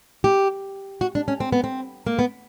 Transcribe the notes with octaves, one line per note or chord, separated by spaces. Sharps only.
G4
F#4
D4
C#4
C4
B3
C4
A#3
B3